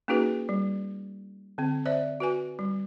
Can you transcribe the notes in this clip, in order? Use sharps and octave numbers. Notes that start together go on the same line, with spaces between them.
A#3 C#4 D#4 F#4 G#4 B4
G3
D3 C4
C5 D5 E5
F#4 B4 G#5
G3